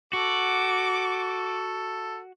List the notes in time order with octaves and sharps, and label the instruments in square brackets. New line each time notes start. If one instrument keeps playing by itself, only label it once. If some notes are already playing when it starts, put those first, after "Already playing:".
[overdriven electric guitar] F#4 [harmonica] A4 [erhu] D6